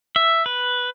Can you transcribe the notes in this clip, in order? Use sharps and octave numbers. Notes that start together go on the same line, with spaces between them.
E5
B4